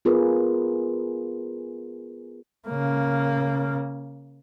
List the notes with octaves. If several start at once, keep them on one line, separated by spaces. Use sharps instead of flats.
B3 F4 G#4 A#4 B4
C#3 A#3